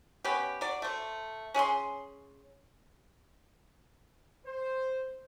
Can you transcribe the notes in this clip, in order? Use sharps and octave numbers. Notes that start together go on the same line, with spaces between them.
B3 C#4 G4
F#3 D5
A3 C5
C#4 G#4 F5 C6
C5